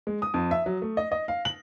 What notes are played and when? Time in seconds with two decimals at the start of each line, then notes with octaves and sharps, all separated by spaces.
0.07 G#3
0.22 D#6
0.34 F2
0.51 E5
0.66 F#3
0.82 A3
0.97 D#5
1.12 D#5
1.28 F5
1.45 F#7